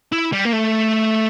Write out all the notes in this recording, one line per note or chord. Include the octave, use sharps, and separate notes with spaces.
E4
G3
A#3
A3